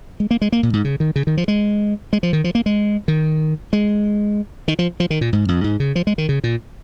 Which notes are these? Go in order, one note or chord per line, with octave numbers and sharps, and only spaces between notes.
G#3
A#3
G#3
A#3
A#2
G#2
C#3
D#3
C#3
D#3
F3
G#3
G#3
F3
D#3
F3
A#3
G#3
D#3
G#3
D#3
F3
F3
D#3
A#2
G#2
F2
G#2
C#3
F3
G#3
D#3
C#3
A#2